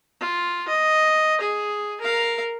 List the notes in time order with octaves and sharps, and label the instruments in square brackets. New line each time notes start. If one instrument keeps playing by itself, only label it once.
[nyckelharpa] F4
D#5
G#4
A#4 F5